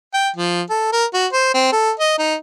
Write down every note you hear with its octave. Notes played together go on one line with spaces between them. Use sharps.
G5
F3
A4
A#4
F#4
C5
C4
A4
D#5
D#4